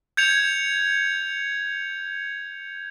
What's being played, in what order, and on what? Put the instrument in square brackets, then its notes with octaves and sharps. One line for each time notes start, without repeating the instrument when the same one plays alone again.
[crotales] G6 G#6 C#7 F7